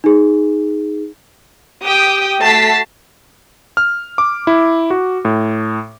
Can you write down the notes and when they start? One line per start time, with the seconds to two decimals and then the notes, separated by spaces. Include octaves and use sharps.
0.04 D#4 G#4
1.84 G4 G5 D#6
2.41 A3 F#4 A5 B6 C7
3.77 F6
4.18 D6
4.47 E4
4.90 F#4
5.25 A2